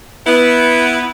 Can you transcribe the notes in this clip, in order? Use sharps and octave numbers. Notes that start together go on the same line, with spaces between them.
B3 E4